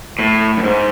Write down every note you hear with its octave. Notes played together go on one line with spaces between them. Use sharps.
A2
F#2
G#2